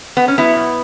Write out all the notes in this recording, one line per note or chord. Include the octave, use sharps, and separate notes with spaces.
B3
C#4
F#3 B3 E4
B2